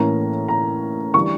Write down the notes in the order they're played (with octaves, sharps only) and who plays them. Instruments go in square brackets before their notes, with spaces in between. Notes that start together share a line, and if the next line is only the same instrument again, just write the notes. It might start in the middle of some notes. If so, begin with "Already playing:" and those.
Already playing: [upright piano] A2 E3 A#3 C#4 A#5
A#5
E3 G3 D4 C#6